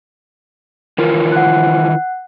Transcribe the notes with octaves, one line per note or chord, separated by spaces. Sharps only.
D#3 E3 F4 A#4
F#5 F#6